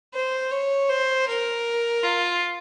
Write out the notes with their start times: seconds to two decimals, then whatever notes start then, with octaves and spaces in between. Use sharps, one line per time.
0.14 C5
0.52 C#5
0.89 C5
1.28 A#4
2.03 F4